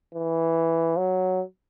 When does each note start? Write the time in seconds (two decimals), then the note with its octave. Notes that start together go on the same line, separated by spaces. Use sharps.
0.14 E3
0.98 F#3